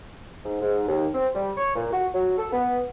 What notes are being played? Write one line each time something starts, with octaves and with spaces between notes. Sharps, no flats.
G#2
G#2
D#2
C4
G3
C#5
A#2
F#4
F#3
A4
B3